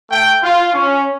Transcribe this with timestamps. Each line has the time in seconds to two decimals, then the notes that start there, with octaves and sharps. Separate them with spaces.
0.11 A3 G5
0.42 F4
0.73 C#4